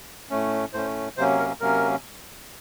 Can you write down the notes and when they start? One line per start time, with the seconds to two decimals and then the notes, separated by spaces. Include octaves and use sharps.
0.30 A2 A3 C#4
0.73 A2 A3 C#4 C5
1.17 C3 F#3 A#3 C#4 C5
1.39 A#4
1.61 C3 F#3 A#3 C#4 A#4